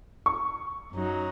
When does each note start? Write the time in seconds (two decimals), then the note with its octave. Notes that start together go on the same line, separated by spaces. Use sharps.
0.26 C#6
0.92 F#2 F#3 D#4